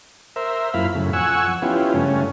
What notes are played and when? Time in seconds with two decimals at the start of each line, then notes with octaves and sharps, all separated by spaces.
0.36 A#4 C5 E5
0.74 F#2 A#3 E4 F4 F5 B5
0.95 F#2 A2 C#3
1.13 F2 F#5 G#5 C#6 E6
1.62 F3 B3 C#4 E4 F4 G4
1.94 G2 C#3 A3 C#4